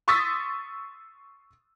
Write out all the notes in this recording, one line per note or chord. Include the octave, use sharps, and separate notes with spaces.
C6 C#6 D#6 E6 A6 B6